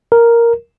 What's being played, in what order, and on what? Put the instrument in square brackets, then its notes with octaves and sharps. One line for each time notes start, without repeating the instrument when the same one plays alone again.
[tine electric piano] A#4